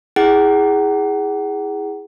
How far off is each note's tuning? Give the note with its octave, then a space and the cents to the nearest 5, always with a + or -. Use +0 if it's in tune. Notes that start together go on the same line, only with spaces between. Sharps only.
E4 -10 G#4 -10 F#5 +30